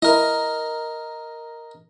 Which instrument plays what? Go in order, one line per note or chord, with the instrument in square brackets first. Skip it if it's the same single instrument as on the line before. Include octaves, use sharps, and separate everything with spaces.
[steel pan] E4 [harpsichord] A#4 D#5